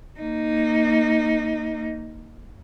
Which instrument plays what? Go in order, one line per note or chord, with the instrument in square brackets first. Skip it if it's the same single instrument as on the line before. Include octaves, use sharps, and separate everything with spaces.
[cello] A#3 D#4